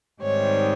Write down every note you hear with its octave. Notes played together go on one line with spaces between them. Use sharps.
G#2 D#3 G3 C4 C#5